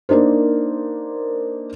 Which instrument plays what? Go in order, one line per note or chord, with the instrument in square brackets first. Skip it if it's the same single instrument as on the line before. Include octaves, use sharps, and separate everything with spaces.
[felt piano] A#3 D4 D#4 A#4 C5